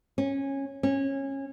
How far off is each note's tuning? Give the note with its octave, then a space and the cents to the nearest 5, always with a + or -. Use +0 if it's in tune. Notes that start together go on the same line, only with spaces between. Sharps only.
C#4 -15
C#4 -20